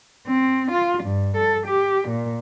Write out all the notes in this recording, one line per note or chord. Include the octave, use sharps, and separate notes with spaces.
C4
F4
G2
A4
G4
A#2